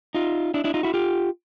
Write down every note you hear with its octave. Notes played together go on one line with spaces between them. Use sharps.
D#4 F4
D4 E4
D4 E4
D#4 F4
E4 F#4
F4 G4